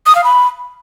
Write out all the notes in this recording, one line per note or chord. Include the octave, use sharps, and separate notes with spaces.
D#6
F5
B5